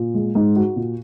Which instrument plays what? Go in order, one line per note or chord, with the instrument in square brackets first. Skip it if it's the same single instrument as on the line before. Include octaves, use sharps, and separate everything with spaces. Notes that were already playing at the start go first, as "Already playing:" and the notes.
Already playing: [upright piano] A#2
G#3
[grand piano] G#2 [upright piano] D#4
[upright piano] F#4
A#2